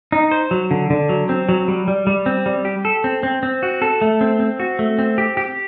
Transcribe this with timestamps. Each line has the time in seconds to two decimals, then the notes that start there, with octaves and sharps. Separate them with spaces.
0.12 D#4
0.32 C5
0.51 F#3
0.71 D3
0.90 D3
1.09 F#3
1.29 C4
1.49 F#3
1.68 G3
1.88 G3
2.07 G3
2.26 C4
2.46 G3
2.65 G4
2.85 A4
3.04 C4
3.23 C4
3.43 C4
3.63 F#4
3.82 A4
4.01 A3
4.21 C4
4.40 C4
4.60 F#4
4.79 A3
4.99 C4
5.18 G4
5.37 G4